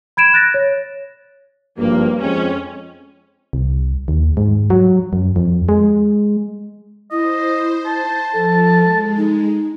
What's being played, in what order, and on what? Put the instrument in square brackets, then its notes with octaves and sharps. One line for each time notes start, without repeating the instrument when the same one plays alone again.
[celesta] B5 G#6 D7 E7
F#6 A6 A#6
C#5
[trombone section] G#1 G2 F3 [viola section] A#3
[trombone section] F2 G#3 C4 [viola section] C#4
[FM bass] C2
D#2
G#2
F#3
F#2
F2
G#3
[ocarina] E4 [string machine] C5 [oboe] D#5
[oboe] A5
[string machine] F3 [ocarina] A4
[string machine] G#3
[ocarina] D#4